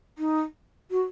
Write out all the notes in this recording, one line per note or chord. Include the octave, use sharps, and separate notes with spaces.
D#4
F#4